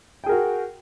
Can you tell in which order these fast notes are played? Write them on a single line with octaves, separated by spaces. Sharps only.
G5 G#4 A#4 F#4